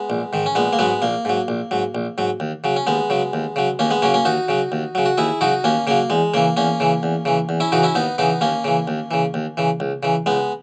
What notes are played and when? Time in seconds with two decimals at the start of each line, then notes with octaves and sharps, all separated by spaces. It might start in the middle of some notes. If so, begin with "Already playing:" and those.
Already playing: G#3 B3
0.10 A#1
0.33 G#2 D#3
0.46 C#4
0.55 A#1 G#3 B3
0.73 A#3
0.79 G#2 F#3 G#3 B3
1.02 A#1 A#3
1.25 G#2 F#3
1.48 A#1
1.71 G#2 F#3
1.95 A#1
2.18 G#2 F#3
2.40 D#2
2.64 C#3 F#3
2.76 C#4
2.87 D#2 G#3 B3
3.10 C#3 F#3
3.33 D#2
3.56 C#3 F#3
3.79 D#2 A#3 C#4
3.91 G#3 B3
4.02 C#3 F#3 A#3 C#4
4.14 A#3 C#4
4.25 D#2 D#4 F#4
4.48 C#3 F#3
4.72 D#2
4.95 C#3 F#3
5.06 F#4
5.18 D#2 E4 G#4
5.41 C#3 F#3 D#4 F#4
5.64 D#2 A#3 C#4
5.87 C#3 F#3 A#3
6.10 E2 G#3
6.34 C#3 E3 A#3
6.57 E2 A#3 C#4
6.80 C#3 E3
7.03 E2
7.25 C#3 E3
7.49 E2
7.60 C#4 E4
7.72 C#3 E3 D#4 F#4
7.83 C#4 E4
7.95 D#2 B3 D#4
8.18 C#3 E3 B3 D#4
8.41 D#2 A#3 C#4
8.65 C#3 E3
8.88 D#2
9.11 C#3 E3
9.34 D#2
9.57 C#3 E3
9.80 C#2
10.03 C#3 E3
10.26 C#2 G#3 B3